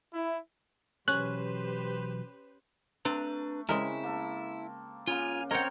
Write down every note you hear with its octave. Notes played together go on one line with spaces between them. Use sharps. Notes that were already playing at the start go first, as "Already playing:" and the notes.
E4
B2 E3 F#3 C#4 G4 B4 C5 F#6
A3 C4 D4 B4 A#5
C#3 G#3 C4 E4 A#4
A#3 A4
C#3 A#3 F4 G#5 F6
C4 A#4 C#5 D#5 F#5 G5 F6